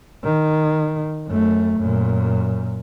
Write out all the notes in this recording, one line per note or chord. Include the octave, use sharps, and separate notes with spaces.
D#3
F#2 A3
F#2 A#2